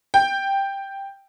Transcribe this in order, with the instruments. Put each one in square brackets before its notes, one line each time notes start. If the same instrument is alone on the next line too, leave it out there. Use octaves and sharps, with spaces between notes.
[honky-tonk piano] G5